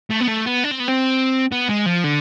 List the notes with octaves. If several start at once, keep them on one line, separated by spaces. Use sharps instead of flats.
A3
B3
A3
B3
D4
C4
B3
C4
B3
G#3
F3
D3